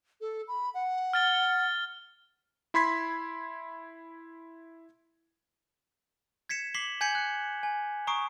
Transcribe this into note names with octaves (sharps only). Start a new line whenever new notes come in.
A4
B5
F#5
F6 A6 G7
E4 B5 C6 G#6 B6
G#6 B6 C#7 E7
D6 B6 C7 F#7 G7
G#5 G6 G#6 B6 C#7 F#7
F#6 C#7
G#5
A#5 C#6 D#6 C7 D7